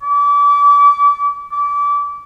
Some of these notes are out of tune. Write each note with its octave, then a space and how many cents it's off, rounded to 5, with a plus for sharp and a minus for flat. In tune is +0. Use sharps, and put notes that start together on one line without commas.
D6 -35
D6 -25